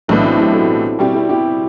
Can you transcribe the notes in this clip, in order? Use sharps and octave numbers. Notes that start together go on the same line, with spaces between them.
B1 A2 E3 B3 D4
C4 E4
E4 G4
F#4 A4
B2 G3 C4 E4 G4
E4 G4
E4 G4